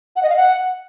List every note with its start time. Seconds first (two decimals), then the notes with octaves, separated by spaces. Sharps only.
0.16 F#5
0.23 D#5
0.30 F5
0.36 F#5